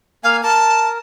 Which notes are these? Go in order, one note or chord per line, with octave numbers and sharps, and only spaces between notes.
A#3 F5 G#5
A#4 A5